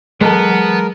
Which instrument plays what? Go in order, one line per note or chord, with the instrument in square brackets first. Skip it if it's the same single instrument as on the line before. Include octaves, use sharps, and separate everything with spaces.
[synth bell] E3 F#3 [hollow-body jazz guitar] G#3 A4 [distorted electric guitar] B3 [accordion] A#4